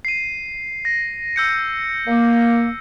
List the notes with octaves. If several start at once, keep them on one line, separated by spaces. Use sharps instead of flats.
C7 D#7
A#6
E6 G6 C#7
A#3